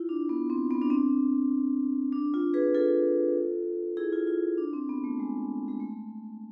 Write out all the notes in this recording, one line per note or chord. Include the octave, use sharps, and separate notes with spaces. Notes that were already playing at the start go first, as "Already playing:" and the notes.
Already playing: E4 F4
D4
B3
C4
B3
D4
C4
D4
F4
G#4 B4
F4 A4
E4 G#4
F4
F4
D4
C4
B3
A3
G#3
G#3
A3